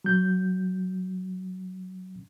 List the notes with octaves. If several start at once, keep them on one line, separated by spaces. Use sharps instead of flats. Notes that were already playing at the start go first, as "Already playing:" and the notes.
F#3 G6